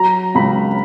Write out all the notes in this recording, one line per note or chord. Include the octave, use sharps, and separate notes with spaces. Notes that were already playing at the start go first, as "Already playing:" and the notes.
Already playing: F#3 A#5
C#2 B5